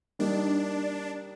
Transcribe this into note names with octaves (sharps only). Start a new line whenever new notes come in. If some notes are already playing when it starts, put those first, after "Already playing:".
G3 A#3 D4 D#4 G4